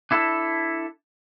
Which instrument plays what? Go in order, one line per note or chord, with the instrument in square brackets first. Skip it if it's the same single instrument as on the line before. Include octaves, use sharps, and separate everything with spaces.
[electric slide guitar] D4 E4 A4